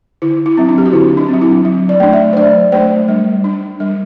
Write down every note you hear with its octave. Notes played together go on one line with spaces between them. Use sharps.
D3 E4
E4
F#3 C4
D4
G4
F#4
D3 E4
D4
C4
F#3
E4
F#3
D5
A3 D4
E5
C5
F#3 D5
A3 D4 C5
G3
D4
G3